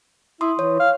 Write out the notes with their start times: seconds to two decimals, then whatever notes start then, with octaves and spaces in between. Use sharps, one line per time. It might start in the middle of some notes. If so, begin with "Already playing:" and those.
0.41 E4 C6 D#6
0.59 E3 C#5
0.80 F5